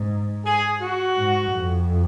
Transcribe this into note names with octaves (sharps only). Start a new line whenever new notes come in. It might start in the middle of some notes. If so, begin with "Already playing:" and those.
Already playing: G#2
G#4
F#4
G#2
F2